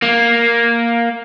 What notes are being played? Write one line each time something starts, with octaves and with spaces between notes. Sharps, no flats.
A#3